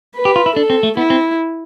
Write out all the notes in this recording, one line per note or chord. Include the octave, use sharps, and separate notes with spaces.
B4
G4
F4
E4
D4 A4
C4
A3
B3 E4
C4